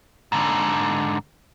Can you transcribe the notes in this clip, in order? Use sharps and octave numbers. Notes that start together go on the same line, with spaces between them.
G#2 D3